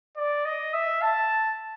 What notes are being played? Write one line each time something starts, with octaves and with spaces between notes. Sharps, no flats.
D5
D#5
E5
A5